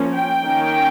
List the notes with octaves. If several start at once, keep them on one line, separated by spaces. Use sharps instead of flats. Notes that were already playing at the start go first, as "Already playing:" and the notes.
Already playing: F3 A#3 C#4
G5
D#3 A#3 C#4